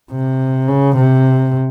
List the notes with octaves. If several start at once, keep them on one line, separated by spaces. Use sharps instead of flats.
C3
C#3
C3